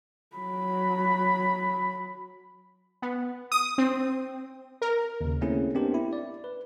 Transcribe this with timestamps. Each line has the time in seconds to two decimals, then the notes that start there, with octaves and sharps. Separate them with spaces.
0.37 F#3 B5
3.02 B3
3.52 D#6
3.78 C4
4.82 A#4
5.21 D#2 C#3
5.41 A3 A#3 C4 C#4 E4 G#4
5.75 B3 C4 D4 G4 A#4 C5
5.94 E4
6.13 D5
6.44 B4